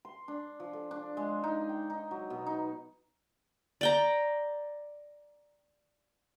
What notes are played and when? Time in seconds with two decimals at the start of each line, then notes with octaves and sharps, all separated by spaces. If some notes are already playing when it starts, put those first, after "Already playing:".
0.05 C6
0.28 D4
0.60 F3
0.73 A4
0.91 D4
1.17 G#3
1.44 D#4
1.69 G5
1.90 D#4
2.11 F#3
2.30 B2
2.47 D#4
3.81 D5 G5 A#5